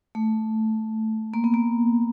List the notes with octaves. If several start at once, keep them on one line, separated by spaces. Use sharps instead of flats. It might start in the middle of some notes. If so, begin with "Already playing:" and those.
A3
A#3
B3
A#3